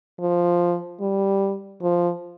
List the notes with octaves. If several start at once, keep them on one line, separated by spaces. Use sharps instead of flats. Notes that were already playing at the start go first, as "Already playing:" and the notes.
F3
G3
F3